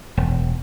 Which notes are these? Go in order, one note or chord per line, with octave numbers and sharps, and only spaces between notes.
E1